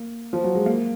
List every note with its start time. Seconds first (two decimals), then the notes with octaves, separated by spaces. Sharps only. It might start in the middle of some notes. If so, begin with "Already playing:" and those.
Already playing: A#3
0.33 F3
0.44 F#3
0.55 G#3
0.66 A#3